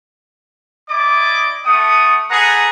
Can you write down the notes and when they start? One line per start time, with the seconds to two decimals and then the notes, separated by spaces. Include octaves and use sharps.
0.89 E4 D5 D#5 D6
1.65 A3 F#5 D#6
2.31 G#4 A4 B4 F#5 A#5